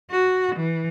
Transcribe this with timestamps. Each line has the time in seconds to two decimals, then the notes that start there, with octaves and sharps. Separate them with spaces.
0.11 F#4
0.56 E3